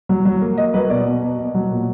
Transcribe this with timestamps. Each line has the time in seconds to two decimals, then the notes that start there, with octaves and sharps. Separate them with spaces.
0.09 F#3
0.25 F#3
0.42 A#3
0.58 A#3 D#5
0.74 F#3 B4
0.90 B2 D5
1.06 B2
1.22 B2
1.39 B2
1.55 F#3
1.71 A#2